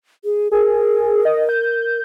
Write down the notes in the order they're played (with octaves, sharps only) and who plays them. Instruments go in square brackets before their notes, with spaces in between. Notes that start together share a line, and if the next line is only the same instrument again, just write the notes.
[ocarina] G#4
[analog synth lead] G#4 [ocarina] A#4
[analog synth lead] D#5
G6